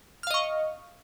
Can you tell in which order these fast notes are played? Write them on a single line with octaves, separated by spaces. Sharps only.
F6 F5 D#5 C#6